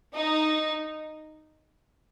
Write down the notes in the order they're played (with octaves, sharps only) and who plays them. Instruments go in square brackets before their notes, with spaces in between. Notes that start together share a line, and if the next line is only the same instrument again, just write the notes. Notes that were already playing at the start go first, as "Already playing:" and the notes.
[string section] D#4